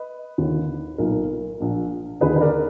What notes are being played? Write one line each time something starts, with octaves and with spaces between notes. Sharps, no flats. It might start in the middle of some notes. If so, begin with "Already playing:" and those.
Already playing: B4 D#5
D#2 D3
B1 A#2 A#4
A#1 A#2
D#2 D3 G#4 B4
B4
A#4 D5